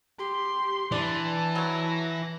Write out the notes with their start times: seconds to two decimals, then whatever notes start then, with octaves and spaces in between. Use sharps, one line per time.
0.19 G4 C6
0.92 E3 D4 A5
1.55 F#3 F#4 A#6